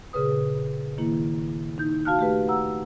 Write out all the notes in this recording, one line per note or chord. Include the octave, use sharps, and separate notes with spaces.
A#2 C#3 G#4 B4 D#6
D#3 A#3 E4
D#4 G6
F#4 F5 A5 F6 F#6
A3 G4 B4
F#5 A#5 E6